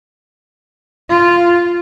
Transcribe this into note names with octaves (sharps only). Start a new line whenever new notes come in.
F4